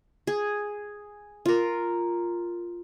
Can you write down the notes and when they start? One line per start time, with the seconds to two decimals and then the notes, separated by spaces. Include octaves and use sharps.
0.27 G#4
1.46 F4 A#4